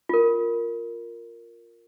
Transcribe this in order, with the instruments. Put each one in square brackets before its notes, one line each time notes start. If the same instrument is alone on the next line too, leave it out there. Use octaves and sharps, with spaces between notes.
[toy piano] F4 A#4